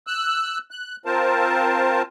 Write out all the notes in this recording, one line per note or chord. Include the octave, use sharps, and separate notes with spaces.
E6 F#6
F#6
C4 F4 A#4 C5 A5